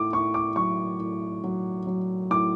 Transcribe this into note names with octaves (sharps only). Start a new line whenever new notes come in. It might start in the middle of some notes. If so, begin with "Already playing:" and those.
Already playing: A2 D6
A2 C#6
D6
F#3 C#6
A2
F#3
F#3
A2 D6